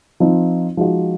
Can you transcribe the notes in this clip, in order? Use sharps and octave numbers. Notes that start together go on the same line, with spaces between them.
F3 C4 D#4
F3 G#3 D#4 F#4